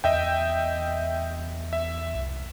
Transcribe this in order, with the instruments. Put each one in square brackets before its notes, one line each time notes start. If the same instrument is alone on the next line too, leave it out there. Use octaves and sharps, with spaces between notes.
[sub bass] E2 [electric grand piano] D#5 E5 G5
[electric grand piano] E5
[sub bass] C2